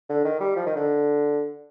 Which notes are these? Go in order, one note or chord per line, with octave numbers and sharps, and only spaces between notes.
D3
D#3
G3
F3
D#3
D3